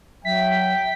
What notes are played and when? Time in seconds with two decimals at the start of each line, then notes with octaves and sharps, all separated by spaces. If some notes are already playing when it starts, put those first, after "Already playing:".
0.25 F#3 E5 G5 B6